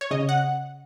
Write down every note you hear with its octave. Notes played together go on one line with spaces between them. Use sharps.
C#5
C#3 D#5
F#5